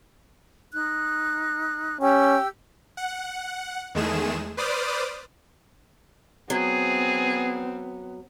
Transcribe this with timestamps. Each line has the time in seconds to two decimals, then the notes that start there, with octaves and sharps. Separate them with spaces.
0.73 D#4 F#6
2.01 C#4 G4 G5 E6
2.97 F#5
3.95 E2 D#3 G#3 A3 G#4 E7
4.57 B4 C5 D5 D6 D#6 F6
6.50 F#3 B3 C4 G#4